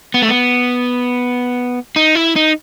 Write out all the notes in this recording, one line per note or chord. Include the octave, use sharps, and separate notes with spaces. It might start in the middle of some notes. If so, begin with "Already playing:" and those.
B3
A3
B3
D#4
E4
D#4